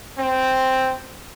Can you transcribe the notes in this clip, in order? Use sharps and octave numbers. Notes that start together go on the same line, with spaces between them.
C4